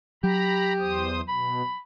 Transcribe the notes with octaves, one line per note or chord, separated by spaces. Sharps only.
F#3 G4 A#5 B5
E2 C5 D#6
B2 B5